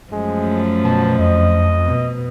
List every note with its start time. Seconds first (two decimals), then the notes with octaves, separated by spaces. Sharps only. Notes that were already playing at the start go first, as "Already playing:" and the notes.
0.12 F#2 F3 G#3 A3
0.84 B2 A5
1.18 F2 D#5
1.86 B2